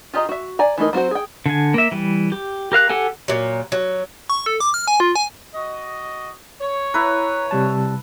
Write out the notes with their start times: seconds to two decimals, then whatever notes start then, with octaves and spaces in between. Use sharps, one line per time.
0.14 F4 G4 G#4 D#5 A#5
0.29 F#4 E5
0.59 D5 G#5 A#5
0.78 E3 A3 D#4 A#4
0.93 F#3 C4 F#4 C5
1.11 G#4 G5
1.46 D3 G#5
1.74 A#3 E5
1.92 E3 G3
2.32 G4
2.72 G4 A#4 F5 F#6
2.90 G4 A4 F#5 G#5
3.28 A#2 F#3
3.72 F#3
4.30 C#6
4.46 A4
4.60 D6
4.74 F6
4.88 G#5
5.00 F4
5.16 G#5
5.54 F#4 D#5
6.59 C#5
6.94 E4 B4 A#5
7.51 C3 G3 A5